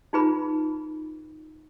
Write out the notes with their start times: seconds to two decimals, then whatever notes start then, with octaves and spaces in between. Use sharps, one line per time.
0.13 D#4 F4 G#4 B4 B5